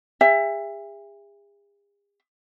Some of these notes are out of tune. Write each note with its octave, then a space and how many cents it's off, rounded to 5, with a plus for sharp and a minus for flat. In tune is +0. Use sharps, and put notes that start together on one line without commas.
G#4 -45 E5 +15